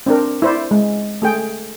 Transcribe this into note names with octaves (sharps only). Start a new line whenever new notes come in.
C4 D4 A#4
E4 C5 D5
G#3
A3 G#4 G5